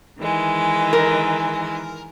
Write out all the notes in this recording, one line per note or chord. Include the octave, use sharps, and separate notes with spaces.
D#3 E3 G#3
A#4